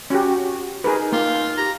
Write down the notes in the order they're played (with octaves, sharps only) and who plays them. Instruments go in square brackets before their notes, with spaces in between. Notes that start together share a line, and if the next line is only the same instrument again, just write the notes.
[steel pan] C#4 G4 [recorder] F#4
[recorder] D#4 [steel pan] G#4 A#4 B4
[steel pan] A#3 [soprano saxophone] F4
[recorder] G4 [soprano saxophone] A#5